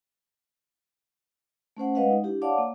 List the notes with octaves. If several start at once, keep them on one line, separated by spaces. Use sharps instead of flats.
A3 C#4 C5 F#5
G#3 B4 D#5 F5 F#5
D#4
D4 E4 G4
C#5 D5 F5 F#5 A5 D6
A#3